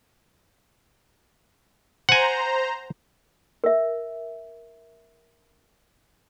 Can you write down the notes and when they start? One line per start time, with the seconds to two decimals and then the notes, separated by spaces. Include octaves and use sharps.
2.09 C5 F#5 G#5 A#5
3.64 A#4 E5